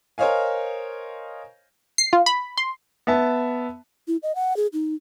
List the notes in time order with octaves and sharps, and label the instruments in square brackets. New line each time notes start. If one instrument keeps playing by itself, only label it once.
[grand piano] A#4 C5 C#5 D#5 F5 G#5
[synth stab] C7
F4
B5
C6
[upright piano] B3 E5 A5
[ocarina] E4
D#5
F#5
G#4
D#4